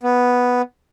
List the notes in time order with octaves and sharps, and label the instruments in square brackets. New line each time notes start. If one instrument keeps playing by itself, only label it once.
[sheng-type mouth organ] B3